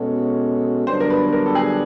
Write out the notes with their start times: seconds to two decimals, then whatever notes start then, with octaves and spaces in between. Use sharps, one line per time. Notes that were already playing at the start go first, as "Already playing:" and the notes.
Already playing: B2 G#3 C#4 F#4 A4
0.87 G2 D3 F#3 B3 D4 C5
1.00 A#4
1.10 B4
1.33 A#4
1.46 A4
1.55 G#4